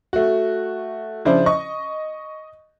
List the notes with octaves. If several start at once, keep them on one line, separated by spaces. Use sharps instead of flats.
A3 F#4
C#3 F3 D4 E4 C5
D#5 C#6